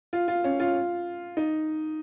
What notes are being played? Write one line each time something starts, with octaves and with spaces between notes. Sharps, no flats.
F4
F4
C#4
F4
D#4